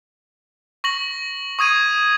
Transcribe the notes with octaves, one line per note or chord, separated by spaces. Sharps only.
C#6 A#6 F#7
C#6 D#6 G#6 D#7